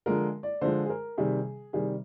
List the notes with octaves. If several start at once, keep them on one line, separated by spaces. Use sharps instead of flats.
D3 F3 G#3 A#4
D5
D3 F3 G#3 C5
G#4
A#4
C3 D#3 G3 G#4
C3 D#3 G3 G#4